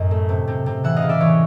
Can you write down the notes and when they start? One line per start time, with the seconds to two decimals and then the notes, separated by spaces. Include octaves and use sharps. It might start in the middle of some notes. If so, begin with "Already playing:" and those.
Already playing: F#2 A2 D#5
0.11 A3
0.29 C3
0.48 C3
0.66 C3
0.84 E3 E5 F#5
0.96 D#5 F5
1.02 C#3
1.09 D5 E5
1.20 E3 C#5 D#5